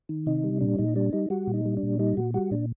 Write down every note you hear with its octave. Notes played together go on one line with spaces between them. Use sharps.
D#3
C3 D#4
G3
A#2 D4
A#2 D#4
G3 D4
G3 D#4
G3 F#4
A#2
D#4
G3
D4
A#2
G3 D#4
A#2 F#4
G3 F#4
A#2 D4